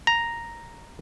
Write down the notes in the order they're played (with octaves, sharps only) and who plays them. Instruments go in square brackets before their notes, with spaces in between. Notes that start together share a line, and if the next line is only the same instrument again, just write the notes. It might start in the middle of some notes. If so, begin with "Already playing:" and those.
[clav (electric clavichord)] A#5